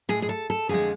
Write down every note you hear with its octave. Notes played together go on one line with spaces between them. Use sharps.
A2 G#3 G#4
G#4
A4
A4
F2 D3 F3 G#3 G#4